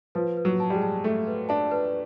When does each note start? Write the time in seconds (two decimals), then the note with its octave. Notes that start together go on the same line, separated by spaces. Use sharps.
0.15 F3 B4
0.37 B4
0.45 F#3
0.60 A5
0.70 G3
0.75 G#3
0.82 A5
1.04 A3 E5
1.27 B4
1.49 D4 A5
1.71 B4